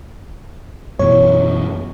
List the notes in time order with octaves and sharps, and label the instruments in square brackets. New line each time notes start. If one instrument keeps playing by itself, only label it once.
[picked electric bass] F#2 B2 E3 [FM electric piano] C#5